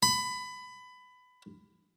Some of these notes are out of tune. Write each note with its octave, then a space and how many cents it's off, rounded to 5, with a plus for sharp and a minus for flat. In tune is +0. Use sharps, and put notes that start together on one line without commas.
B5 +20